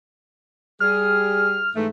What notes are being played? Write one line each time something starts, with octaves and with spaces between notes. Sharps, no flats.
G3 G#4 F6
G#2 E3 A3